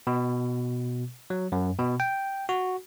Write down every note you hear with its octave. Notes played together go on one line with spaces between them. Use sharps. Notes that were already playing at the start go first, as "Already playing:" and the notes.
B2
F#3
F#2
B2
G5
F#4